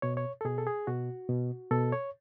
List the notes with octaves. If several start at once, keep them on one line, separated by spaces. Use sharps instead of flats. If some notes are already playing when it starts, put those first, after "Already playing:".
B2 C#5
C#5
A4
B2 G#4
A4
G#4
B2 F#4
B2
B2 A4
C#5